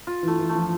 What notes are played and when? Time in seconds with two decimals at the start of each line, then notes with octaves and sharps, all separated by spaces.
0.07 F4
0.23 E3
0.28 A3
0.39 E3
0.49 A3
0.55 F3